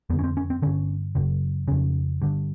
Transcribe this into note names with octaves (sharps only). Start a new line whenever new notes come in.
F2 D3 B3
C#4
C4
C#4
C4
G2 D3 C#4
F#2 C#3
F2 C#3 C#4
G2 D3